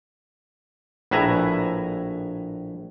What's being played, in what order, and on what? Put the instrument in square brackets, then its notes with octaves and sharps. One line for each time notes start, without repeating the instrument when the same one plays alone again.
[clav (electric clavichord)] A#1 A2 B4 E5 G#5 A#5